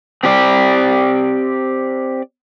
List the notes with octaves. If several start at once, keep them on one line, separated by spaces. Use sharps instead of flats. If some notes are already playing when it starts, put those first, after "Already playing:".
C4 G4 D5